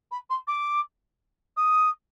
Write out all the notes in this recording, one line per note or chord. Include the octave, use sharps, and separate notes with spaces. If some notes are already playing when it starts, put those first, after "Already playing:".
B5
C6
D6
D#6